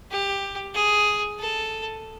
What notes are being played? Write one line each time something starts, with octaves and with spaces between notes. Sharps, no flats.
G4
G#4
A4